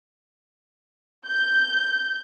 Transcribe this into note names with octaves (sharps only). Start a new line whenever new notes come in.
G6